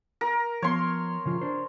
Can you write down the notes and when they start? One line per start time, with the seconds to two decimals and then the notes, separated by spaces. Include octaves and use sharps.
0.21 A#4
0.62 F3 B3 C#5 C6
1.26 C#3 F3 F4
1.41 D4 C5